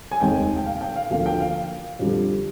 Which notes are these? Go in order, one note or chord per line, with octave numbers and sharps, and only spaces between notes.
G#5
F1 D#2 D#3 G#3 C4 G5
G5
F5
G5
F5
D2 D3 F3 A#3 F5
G5
F5
F2 D3 G3